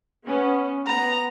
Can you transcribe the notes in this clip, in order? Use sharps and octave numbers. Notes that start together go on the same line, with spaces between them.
B3 C#4
B3 A#5